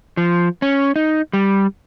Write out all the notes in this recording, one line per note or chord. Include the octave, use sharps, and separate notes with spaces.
F3
C#4
D#4
G3